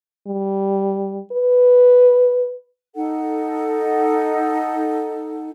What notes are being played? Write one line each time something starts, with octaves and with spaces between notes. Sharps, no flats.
G3
B4
D#4 A4 F#5